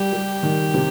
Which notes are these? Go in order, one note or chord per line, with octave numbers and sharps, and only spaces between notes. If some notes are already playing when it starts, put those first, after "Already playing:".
Already playing: G3 G4
G3
D#3
C3